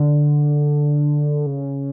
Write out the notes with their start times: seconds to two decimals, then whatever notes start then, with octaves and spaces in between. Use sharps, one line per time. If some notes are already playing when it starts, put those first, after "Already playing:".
Already playing: D3
1.46 C#3